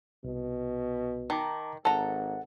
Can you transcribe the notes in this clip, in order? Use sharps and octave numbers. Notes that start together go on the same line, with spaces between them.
C2 B2
D#3 A5 A#5 D6
G#1 A4 F#5 A#5